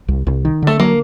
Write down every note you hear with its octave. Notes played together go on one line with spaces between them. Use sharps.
C2
C2
D#3
D3 A3
F#3 A#3